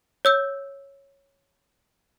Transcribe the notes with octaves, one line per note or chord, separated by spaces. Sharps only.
C#5 E6 G6